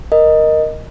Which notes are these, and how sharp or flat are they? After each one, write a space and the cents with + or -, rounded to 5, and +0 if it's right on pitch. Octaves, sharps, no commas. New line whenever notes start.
A#4 +0 D#5 -5